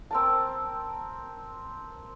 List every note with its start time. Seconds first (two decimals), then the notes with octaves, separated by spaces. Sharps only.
0.11 C4 A#4 A5